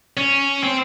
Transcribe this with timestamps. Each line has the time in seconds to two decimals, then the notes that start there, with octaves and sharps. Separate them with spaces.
0.17 C#4
0.63 C4